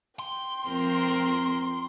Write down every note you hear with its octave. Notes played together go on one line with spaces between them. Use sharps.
G5 C6
F2 C4 A#4